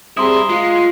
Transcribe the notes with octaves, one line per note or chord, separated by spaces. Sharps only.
G3 C4 E4 G#4 A#5 C6 D#6
G#3 F4